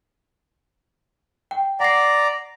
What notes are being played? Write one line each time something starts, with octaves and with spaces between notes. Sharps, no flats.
G5
D5 F#5 A#5 C7